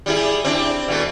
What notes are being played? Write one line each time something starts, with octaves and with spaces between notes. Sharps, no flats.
G3 E4 G#4
C4 D4 E4
B2 E3 A3